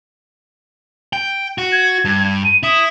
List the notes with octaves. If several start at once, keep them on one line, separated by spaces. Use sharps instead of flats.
G5
F#4
G#6
G2
D#7
E4 D#6